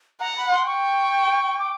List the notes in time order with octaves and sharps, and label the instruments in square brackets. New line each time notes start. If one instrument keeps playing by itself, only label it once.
[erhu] F#5 [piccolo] A#5
[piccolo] B5
C6
[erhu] G5 [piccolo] C#6
[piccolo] D6